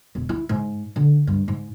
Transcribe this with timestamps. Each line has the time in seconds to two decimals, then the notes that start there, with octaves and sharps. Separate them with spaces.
0.15 E1
0.29 E4
0.49 G#2
0.96 D3
1.27 G2
1.48 G#2